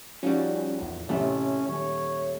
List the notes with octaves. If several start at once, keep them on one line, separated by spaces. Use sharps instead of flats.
F3 G3 C#4 D#4 F#4
E2 A2
A1 C3 A3 C#4
D#1 C#5